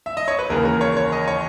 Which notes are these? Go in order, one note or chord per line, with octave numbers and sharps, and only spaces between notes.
E5
D#5
C#5
B4
D#2 C#3 E3 A#3 A#4
A#4
C#5
C#5
D#5
C#5